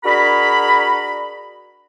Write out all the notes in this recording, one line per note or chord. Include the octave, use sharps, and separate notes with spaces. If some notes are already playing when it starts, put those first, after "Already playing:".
D4 F#4 G#4 A#4 A#5 B5